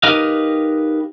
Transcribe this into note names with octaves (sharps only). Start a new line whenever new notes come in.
D#4 G4 A#4 B4 D#5 F5